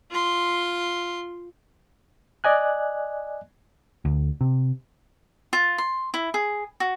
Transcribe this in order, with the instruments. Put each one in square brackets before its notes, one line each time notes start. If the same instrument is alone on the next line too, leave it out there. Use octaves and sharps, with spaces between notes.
[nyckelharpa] F4 C6
[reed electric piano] D5 D#5 G#5 F#6
[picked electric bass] D2
C3
[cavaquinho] F4
C6
E4
G#4
F#4